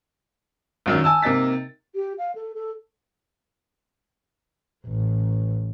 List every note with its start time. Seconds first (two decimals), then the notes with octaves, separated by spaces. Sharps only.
0.86 A#1 F#2 D#3
1.04 G#5 A5 E6
1.22 C3 A#3 D#4 A6 B6
1.95 G4
2.18 F5
2.35 A4
2.55 A4
4.87 A1